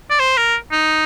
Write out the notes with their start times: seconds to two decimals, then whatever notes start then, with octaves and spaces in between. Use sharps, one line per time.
0.10 D5
0.20 C5
0.37 A#4
0.72 D#4